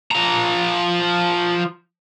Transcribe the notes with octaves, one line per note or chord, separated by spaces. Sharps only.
F3 A#5